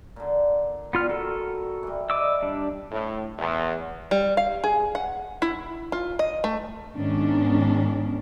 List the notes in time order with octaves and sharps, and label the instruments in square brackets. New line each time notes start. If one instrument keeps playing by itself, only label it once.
[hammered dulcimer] A#2 D3
[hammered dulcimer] G3 [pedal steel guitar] B3 F4 F6
[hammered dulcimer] D#3 [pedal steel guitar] F#4 A4
[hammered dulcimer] E3 G3
[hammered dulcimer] D5 [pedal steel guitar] D#5 D6 E6
[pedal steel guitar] G3 D4
[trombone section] A2
E2
[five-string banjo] G3
F5
G#4
F#5
E4
F4
D#5
A3
[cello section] G#2 D#3 B3 C#4 D4